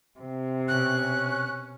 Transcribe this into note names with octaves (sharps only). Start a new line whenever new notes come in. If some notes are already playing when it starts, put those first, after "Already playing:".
C3
B2 C#4 F#6